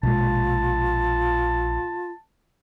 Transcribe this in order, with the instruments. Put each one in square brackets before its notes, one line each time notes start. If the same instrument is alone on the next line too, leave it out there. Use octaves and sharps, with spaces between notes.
[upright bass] A#1 [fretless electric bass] B2 G#3 [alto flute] F4 [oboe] A5